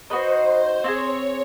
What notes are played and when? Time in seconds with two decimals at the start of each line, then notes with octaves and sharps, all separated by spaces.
0.10 D#4 F#4 B4 C5 D#5
0.84 C4 E4 G#4 C#5